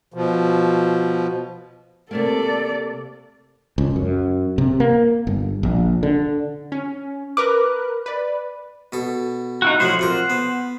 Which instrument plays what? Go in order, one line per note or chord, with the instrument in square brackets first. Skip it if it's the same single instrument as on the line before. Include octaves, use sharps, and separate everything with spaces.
[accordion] B2 F3
[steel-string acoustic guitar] C3 A3 A#3 [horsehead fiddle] A4 D5
[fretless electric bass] C#2
F#2
C3
A#3
G1
A#1
D3
[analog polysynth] C#4
[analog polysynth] A#4 B4 F#6 [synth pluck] D6
[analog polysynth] B4 D5
[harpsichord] B2 A4
[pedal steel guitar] D#4 E4 F#4
[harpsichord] A2 F3 F#3 [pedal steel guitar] C5 F#5
[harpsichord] F2 F4 A#4
B3